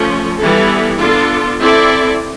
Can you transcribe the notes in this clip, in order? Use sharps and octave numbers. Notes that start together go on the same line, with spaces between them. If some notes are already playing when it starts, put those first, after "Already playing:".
Already playing: F3 A3 C#4
E3 G3 B3 E4 A4
B3 D4 F4 A4
C4 E4 A4 D5